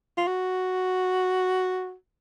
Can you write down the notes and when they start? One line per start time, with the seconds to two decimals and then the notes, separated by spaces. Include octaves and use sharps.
0.18 F4
0.27 F#4